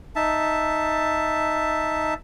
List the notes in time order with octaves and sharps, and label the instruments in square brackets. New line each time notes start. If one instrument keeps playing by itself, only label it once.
[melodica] D#4 E5 A5